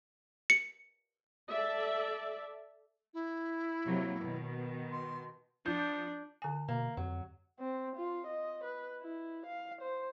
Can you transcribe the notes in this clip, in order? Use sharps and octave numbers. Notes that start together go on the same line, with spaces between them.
C#7
A4 D5 E5
E4
C3 F#3 A#3
B2 D#3
C6
F3 D4 G6
D3 G#5
B2 A#3
F2 F#3
C4
F4
D#5
B4
E4
F5
C5